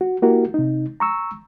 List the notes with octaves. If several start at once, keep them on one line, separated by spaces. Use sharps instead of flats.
F#4
A#3 E4 F#4 G4 A#4
C3 D#4
A#5 C#6 E6